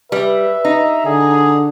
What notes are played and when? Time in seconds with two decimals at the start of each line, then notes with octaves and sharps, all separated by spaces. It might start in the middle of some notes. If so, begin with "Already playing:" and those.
0.12 G3 B4 E5
0.65 D#4
1.06 D3 G#4